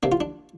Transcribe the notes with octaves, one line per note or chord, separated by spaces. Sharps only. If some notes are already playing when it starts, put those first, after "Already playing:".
C3 A#3 D4
F4
D4